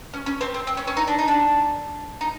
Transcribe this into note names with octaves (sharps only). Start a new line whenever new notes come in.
C#4
C#4
C4
C4
C4
C#4
C#4
D#4
D4
D#4
D4
D#4